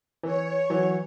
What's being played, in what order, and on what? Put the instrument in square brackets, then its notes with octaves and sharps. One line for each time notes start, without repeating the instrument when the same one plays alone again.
[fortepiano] E3 [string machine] C#5
[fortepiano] E3 [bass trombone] F#3